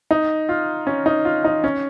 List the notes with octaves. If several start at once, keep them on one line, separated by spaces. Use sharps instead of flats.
D#4
F4
C#4
D#4
F4
D#4
C#4